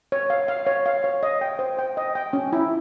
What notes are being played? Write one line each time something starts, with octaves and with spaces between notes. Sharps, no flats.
C#5
F5
F5
C#5
F5
C#5
D#5
G5
C5
G5
D#5
G5
C#4
E4